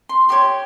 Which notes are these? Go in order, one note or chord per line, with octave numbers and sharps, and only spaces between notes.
C6
G4 C#5 C6